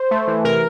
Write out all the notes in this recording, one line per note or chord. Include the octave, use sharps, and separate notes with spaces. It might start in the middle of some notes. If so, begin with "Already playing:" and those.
Already playing: C5
A3
E3
C3 A#4